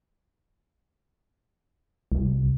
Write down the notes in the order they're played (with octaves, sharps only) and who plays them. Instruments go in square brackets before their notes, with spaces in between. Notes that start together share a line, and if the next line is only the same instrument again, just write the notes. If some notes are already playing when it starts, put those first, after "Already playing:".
[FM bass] C2